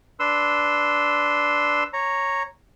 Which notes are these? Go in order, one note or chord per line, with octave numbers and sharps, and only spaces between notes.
D4 B4 C6 E6
C#5 A#5